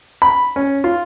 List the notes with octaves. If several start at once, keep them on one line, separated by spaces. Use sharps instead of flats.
B5
C#4
F4